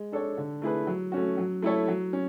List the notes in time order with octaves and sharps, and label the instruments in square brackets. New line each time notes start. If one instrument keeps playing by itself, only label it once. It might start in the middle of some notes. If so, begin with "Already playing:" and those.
Already playing: [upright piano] G#3
D4 A4 C#5
D3
A3 E4 G#4 B4
F#3
A3 C#4 F#4
F#3
A3 E4 A4 C#5
F#3
C#4